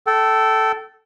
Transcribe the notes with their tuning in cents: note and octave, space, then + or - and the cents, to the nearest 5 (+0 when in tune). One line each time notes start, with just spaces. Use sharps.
A4 +0 G5 -35